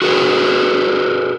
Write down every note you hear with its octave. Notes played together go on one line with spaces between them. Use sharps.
F#4 G#4 A#4 B4